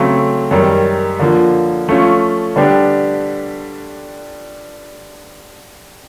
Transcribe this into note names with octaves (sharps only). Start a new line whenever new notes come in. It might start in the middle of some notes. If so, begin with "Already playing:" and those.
Already playing: C#3 F#3 A3 C4
F#2 D#3 G3
D3 F3 A#3
F3 A3 C#4 F4
D3 G3 B3 D4 G4